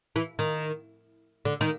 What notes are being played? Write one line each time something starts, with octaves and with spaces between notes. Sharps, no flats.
E3
D#3
D3
D#3